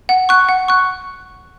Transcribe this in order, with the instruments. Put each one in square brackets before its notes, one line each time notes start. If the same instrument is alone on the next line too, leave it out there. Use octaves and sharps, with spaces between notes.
[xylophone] F#5
C#6 F#6
F#5
C#6 F#6